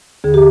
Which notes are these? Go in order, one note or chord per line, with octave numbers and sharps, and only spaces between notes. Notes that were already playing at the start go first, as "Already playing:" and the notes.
D#2 D3 G#4
G4